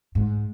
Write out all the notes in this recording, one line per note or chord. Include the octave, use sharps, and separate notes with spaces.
G#2